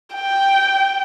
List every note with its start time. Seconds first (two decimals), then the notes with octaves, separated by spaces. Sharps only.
0.15 G5